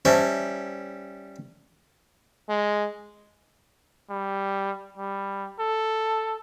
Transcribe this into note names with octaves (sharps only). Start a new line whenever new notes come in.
G3 C#4 E4 C5 E5 A5
G#3
G3
G3
A4